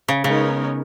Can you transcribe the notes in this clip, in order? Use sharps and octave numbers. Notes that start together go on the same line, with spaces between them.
C#3
C#3 G#3 B3 D#4 A#4 C#5